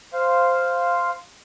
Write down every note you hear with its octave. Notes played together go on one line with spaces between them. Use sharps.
C5 F5